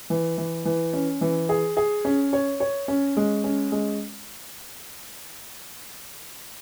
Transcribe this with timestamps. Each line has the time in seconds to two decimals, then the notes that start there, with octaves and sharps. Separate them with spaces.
0.10 E3
0.38 E3
0.65 E3
0.93 C#4
1.21 E3
1.49 G#4
1.77 G#4
2.05 C#4
2.33 C#5
2.60 C#5
2.88 C#4
3.17 G#3
3.44 C#4
3.72 G#3